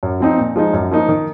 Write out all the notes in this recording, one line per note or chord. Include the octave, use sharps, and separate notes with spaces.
F#2
F3 C4 D#4
A#2
F3 G#3 D#4
F#2
F3 A#3 D#4
D#3